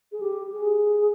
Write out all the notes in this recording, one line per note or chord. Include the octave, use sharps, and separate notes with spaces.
G#4
G4
G#4